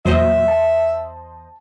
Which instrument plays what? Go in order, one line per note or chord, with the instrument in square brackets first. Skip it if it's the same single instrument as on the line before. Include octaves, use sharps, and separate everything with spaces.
[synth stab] E2 C5 D#5 [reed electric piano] A#2 F#3 [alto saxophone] E5
[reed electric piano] A5